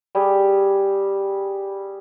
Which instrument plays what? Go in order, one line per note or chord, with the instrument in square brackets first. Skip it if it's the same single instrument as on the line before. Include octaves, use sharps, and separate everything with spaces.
[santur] G3 G4 G#4